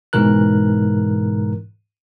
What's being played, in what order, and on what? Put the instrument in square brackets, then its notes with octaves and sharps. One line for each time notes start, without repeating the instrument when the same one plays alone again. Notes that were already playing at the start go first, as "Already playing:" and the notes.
[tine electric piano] G#2 B2 E3 A#4 F#6